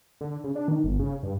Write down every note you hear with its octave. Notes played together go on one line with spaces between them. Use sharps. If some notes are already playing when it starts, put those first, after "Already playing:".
D3
C#3
D4
D#3
G1
C#3
G2